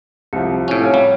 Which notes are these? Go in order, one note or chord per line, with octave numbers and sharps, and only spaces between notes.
C2 F3 C#7
A2 C#4
C#5 F5 F6
G3